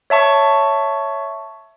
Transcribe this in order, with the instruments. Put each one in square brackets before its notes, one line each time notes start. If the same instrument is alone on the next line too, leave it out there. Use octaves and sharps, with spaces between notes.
[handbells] C#5 E5 A5 C#6